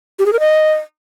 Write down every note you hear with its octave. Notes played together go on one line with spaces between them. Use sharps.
G4
G#4
A#4
D#5